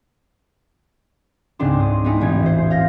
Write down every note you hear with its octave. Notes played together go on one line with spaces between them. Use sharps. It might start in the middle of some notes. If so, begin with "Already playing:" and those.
C#2 G#2 C#3 C4 D4 C6
D#6
G#3 B3 C4 D#4 E4
E1 A1 C4 G#6
E3 C5
F5 G6 A#6